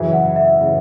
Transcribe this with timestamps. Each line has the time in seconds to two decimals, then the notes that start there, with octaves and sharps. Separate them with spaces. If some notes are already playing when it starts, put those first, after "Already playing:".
Already playing: F#2 C#3 E3 E5
0.13 F#5
0.36 E5
0.61 C#3 E3